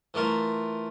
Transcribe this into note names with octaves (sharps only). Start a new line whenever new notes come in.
E3 A3 F4 A#4